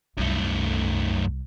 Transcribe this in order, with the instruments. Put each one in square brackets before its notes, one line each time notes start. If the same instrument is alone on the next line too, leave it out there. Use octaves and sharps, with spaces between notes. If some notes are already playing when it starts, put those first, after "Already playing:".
[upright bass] C2 [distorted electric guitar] F#2 A3